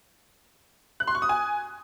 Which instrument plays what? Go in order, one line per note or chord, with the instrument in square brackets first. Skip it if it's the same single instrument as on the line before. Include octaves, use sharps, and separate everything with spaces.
[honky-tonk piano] F#6
C6
C#6
D#6
G#5